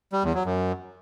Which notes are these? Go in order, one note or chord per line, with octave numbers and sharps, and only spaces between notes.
G3
E2
F#3
F#2